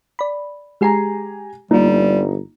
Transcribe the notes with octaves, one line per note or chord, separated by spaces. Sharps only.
D5 B5
G#3 G4 G#4 G#5 A#5 C7
G1 G3 A#3 D#4 F4